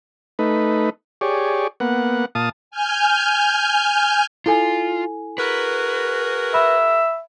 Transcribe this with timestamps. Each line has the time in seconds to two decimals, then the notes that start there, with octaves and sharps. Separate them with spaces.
0.39 A3 D#4 B4
1.21 G4 G#4 C#5 D5
1.80 A#3 B3 F#5
2.35 A#2 F5 A5 D#6
2.71 G#5 F6 G6
4.46 E4 F4 A4 G#5
5.38 F#4 G#4 A#4 B4
6.54 E5 B5